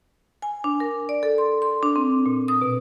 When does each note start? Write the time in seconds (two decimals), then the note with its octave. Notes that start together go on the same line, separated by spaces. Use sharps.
0.42 G#5
0.64 D4
0.80 A#4
1.09 D5
1.23 A4
1.38 C6
1.62 C6
1.83 D4
1.96 C4
2.26 A#2
2.48 D#6
2.61 B2